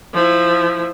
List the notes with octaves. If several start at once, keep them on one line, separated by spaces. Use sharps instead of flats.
F3 E4